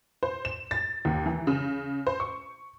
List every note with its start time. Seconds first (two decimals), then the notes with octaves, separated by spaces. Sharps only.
0.23 C5
0.45 E7
0.71 A6
1.05 D#2
1.26 E3
1.47 C#3
2.07 C5
2.20 C#6